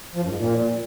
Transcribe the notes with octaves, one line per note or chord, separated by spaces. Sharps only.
F3
F#2
G#2
A#2